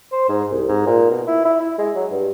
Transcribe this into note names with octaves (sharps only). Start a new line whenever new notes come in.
C5
G#2
C2
G#2
A#2
B2
E4
E4
E4
G#3
F#3
G2